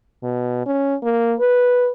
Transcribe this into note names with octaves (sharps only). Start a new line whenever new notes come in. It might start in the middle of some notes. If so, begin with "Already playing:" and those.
B2
C#4
A#3
B4